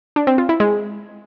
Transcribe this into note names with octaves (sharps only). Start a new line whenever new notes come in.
D4
C4
F4
E4
G#3